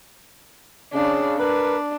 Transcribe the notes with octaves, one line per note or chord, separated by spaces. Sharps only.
C#3 D4
D4 A#4 B4